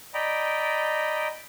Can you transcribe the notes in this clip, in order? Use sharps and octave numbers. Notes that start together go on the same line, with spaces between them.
D5 D#5 G5 A#5 B5